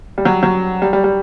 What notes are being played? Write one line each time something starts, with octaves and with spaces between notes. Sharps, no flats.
G3
F#3
F#3
G3
G3
G3